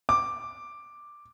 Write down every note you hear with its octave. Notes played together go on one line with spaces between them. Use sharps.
D6